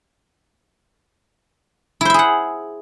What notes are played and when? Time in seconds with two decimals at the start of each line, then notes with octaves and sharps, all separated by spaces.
2.01 E4
2.05 C5
2.10 E5
2.14 G#4
2.19 F#5